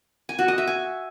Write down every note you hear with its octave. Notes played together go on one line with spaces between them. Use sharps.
G#5
F#4
D#5
E5
G#5